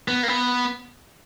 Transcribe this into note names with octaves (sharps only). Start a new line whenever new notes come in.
B3
A#3
B3